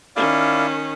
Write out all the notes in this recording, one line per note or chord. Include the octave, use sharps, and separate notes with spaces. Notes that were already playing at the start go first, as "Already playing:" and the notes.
D#3 C#4 E4 D5 F5